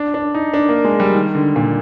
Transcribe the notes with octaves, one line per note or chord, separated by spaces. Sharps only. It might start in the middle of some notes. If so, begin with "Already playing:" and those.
Already playing: D4
D4
D#4
D4
A#3
G#3
G3
D#3
D3
A#2